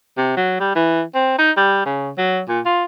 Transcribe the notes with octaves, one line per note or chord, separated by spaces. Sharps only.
C3
F#3
G3
E3
C4
D#4
G3
C#3
F#3
A#2
F4